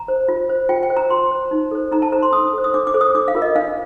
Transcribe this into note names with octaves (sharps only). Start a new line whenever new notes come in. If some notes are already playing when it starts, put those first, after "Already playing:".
Already playing: A#5
C5
F4
C5
F4 G5
G5
C5
A#5
F4 C6
C5
D#4
A4 C5
D#4 A#5
A5
A4 C5 A#5
C6
D4 D#6
A4 C5
D#6
D4 D6
D6
A4 C5
D#6
D4 D6
F5
F4 A#4
D#5
D4 F5